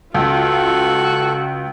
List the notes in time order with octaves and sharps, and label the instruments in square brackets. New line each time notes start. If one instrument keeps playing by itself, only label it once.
[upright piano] C#2 [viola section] F4 [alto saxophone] F#4 [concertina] A4